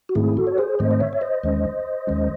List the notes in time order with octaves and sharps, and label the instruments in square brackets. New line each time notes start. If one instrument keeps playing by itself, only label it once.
[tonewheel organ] F#4
G#2 D#3 A3 C4 E4 G#4
F#4 A4
C#5
G#4 C5
G#2 D#3 A3 C4 C5 D#5
D#5
C#5 E5
E5
C5 D#5
D#2 D#3 G#3 C#4
D#2 D#3 G#3 C#4